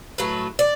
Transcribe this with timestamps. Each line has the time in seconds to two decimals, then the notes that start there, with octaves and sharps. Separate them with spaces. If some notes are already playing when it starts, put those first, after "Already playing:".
0.18 A2 F#3 A3 B4
0.59 D5